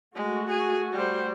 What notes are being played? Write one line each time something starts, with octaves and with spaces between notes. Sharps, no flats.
G#3 A3 F#4
G#4 G#5
G3 G4 C5